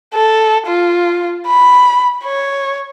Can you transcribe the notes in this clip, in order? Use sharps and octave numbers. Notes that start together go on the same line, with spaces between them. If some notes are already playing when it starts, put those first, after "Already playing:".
A4
F4
B5
C#5